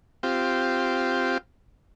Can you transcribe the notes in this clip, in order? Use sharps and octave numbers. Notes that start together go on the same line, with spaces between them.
C4 F4 G4